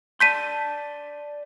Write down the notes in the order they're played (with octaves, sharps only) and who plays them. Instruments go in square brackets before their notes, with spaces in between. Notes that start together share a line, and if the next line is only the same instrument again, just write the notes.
[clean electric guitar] D5 A5 C6 [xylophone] G6 B6 D#7